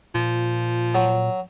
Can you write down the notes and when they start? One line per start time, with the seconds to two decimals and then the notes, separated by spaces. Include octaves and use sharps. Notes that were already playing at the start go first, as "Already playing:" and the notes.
0.15 A#2 F3
0.95 F#3